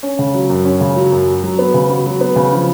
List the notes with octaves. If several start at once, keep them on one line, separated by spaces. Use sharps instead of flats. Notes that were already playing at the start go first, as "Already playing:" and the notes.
C#4
C#3
F#3
F#2
C#4
C#3
F#3
F#2
F#4
F#3
B3
C#3
F#4
F#3
B3
C#3
F3